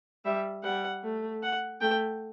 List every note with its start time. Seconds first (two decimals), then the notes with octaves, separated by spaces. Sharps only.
0.25 G3 E5
0.63 G3 F#5
1.03 A3
1.43 F#5
1.81 A3 G5